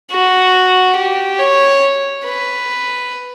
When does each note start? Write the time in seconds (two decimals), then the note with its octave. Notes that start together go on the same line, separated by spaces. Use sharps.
0.11 F#4
0.96 G4
1.39 C#5
2.24 B4